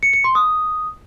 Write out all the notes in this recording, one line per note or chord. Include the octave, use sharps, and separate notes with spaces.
C#7
C#7
C6
D#6